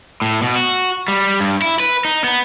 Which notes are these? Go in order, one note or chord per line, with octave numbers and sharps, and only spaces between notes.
A2
B2
F#4
G3
G2
E4
B4
D#4
B3